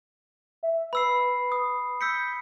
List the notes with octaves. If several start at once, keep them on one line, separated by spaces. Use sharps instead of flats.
E5
B4 B5 E6 C7
D#6
E6 G6 B6 C#7